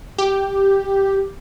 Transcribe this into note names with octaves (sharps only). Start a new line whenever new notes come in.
G4